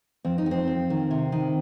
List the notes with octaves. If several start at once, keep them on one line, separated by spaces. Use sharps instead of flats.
F2 C4
D#4
F2
C4
F2
D#3
C3
D#3